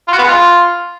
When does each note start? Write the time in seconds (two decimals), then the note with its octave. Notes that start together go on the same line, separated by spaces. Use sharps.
0.08 F4
0.13 F#4
0.18 B3
0.23 G#3
0.29 F4